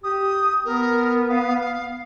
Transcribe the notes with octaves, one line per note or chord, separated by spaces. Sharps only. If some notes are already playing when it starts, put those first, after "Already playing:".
G4 D#6
B3 A#4
F5